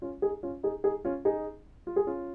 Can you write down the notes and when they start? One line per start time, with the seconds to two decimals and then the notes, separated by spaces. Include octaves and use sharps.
0.02 C#4 F4
0.22 D#4 G#4
0.43 C#4 F4
0.63 D#4 G#4
0.84 D#4 G#4
1.05 C#4 F4
1.25 D#4 G#4
1.87 F4
1.96 G#4
2.07 C#4 F4